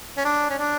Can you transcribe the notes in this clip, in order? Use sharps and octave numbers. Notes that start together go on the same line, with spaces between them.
C#4
D4
C#4
D4